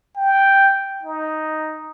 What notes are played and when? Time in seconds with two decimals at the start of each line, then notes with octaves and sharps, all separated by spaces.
0.17 G5
1.03 D#4